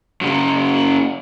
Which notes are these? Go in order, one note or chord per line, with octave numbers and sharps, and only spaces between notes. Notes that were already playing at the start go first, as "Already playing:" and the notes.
F#2 C#3